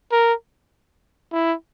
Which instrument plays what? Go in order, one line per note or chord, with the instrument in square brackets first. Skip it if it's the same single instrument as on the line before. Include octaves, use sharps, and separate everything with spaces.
[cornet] A#4
E4